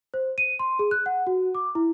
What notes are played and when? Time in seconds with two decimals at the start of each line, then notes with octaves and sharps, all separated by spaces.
0.14 C5
0.38 D#7
0.59 C6
0.79 G#4
0.91 F#6
1.06 F#5
1.27 F#4
1.55 D6
1.75 E4